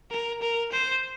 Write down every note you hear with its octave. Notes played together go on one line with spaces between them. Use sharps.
A#4
A#4
C5